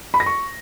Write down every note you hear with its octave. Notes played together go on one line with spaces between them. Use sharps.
B5
A#6
C#6